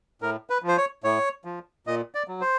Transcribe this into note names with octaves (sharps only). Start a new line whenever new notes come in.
A2 A#4
B4
F3
C5
C#5
A2 C#5
F3
A#2 D#5
D5
F#3
C5